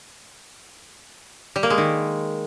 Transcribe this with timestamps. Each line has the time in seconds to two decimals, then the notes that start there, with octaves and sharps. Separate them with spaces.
1.56 G3
1.63 A#3
1.70 G#3
1.78 D#3